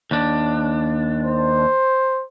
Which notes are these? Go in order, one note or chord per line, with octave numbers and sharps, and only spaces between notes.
D#2 D4
C5